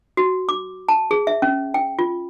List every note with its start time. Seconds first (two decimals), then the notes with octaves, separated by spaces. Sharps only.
0.17 F#4
0.49 D6
0.89 A5
1.11 G#4
1.27 E5
1.42 C#4
1.74 G5
1.99 F4